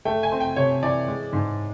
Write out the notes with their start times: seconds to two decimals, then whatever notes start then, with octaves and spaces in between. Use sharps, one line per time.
0.05 A3 G5
0.23 G#5
0.32 C4
0.40 G5
0.56 C3 C#5
0.82 E3 D5
1.08 G#3
1.33 G#2